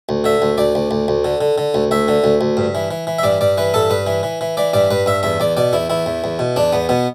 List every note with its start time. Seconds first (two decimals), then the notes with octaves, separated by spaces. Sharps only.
0.09 D2
0.24 D3 E5
0.42 D2
0.58 D2 D5
0.75 D2
0.91 D2
1.08 D2
1.25 D3
1.41 D3
1.58 D3
1.74 D2
1.91 D2 E5
2.08 D3
2.24 D2
2.41 D2
2.57 G2
2.75 E3
2.91 E3
3.07 E3
3.19 E5
3.23 G2 D5
3.41 G2 D5
3.58 E3 B4
3.74 G2 A4
3.90 G2 B4
4.07 E3
4.23 E3
4.41 E3
4.57 E3 D5
4.74 G2 D5
4.91 G2 B4
5.06 G2 E5
5.23 E2 E5
5.40 E2 D5
5.57 B2 D5
5.73 E2 E4
5.90 E2 E4
6.06 E2
6.24 E2
6.39 B2
6.56 E2 D4
6.72 E2 B3
6.89 B2 B3